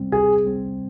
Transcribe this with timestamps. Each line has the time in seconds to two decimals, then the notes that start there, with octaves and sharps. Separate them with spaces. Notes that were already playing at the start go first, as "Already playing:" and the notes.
Already playing: C3 G3 C4
0.12 C3 G#4
0.45 G3 C4